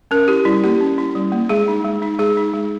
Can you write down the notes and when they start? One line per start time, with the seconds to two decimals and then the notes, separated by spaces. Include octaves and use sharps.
0.11 C#4 A#4
0.28 E4 G4
0.45 G3 E4
0.64 A#3 G4
0.81 C#4
0.98 E4
1.15 G3
1.32 A#3
1.49 G#3 G#4
1.68 D#4
1.85 G#3
2.02 D#4
2.19 G#3 G#4
2.37 D#4
2.54 G#3